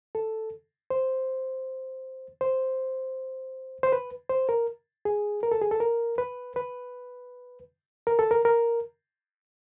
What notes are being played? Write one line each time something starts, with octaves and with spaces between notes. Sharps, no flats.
A4
C5
C5
C5
B4
C5
A#4
G#4
A#4
A4
G#4
A4
A#4
B4
B4
A#4
A4
A#4
A#4